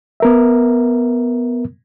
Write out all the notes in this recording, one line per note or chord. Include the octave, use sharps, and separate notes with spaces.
B3 A#4 E5